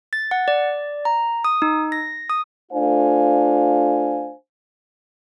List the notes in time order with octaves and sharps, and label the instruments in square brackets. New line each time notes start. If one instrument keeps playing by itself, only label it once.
[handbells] A6
F#5
D5
A#5
D#6
D#4
A#6
D#6
[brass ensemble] A3 D4 F4 C5 F5 G#5